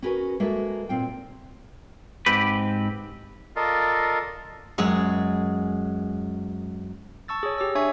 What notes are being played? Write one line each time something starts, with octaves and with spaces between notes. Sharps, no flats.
C#4 F#4 G#4 A#4 B4
G#3 A#3 F#4 A4 E5
A#2 C4 F4 G5
G#2 C4 G4 B4
F4 A4 A#4 D5 D#5 F5
F#2 G#3 G#4
A5 C#6 E6 A6
G#4 C#5
G4 D6 E6
D4 C#5 E5 G#5 C#6